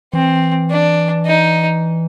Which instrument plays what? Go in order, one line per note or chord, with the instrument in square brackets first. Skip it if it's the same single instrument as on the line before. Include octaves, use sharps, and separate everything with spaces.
[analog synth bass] E3 [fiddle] C4
[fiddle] D4
D#4